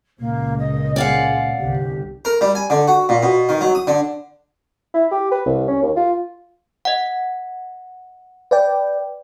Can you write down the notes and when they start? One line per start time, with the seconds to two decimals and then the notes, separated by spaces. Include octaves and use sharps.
0.20 C#2 A#2 A#3
0.58 D#5
0.96 G#3 D5 F5 F#5
1.59 G1 C2 G4
2.25 A#4
2.41 G3
2.55 G#5
2.70 D3
2.88 F#4
3.09 A#2
3.23 B2
3.49 D#3
3.61 F#3
3.75 D#6
3.87 D3
4.94 E4
5.11 G4
5.31 B4
5.45 C2
5.68 C#4
5.82 D#2
5.96 F4
6.85 D#5 F#5
8.51 B4 D5 G5